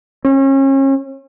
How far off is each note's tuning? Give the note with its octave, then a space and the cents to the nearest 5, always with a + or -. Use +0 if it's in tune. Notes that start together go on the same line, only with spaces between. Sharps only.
C#4 -35